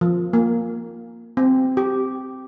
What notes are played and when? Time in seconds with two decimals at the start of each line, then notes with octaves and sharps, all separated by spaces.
0.01 F3
0.33 A#3
1.37 C4
1.77 G4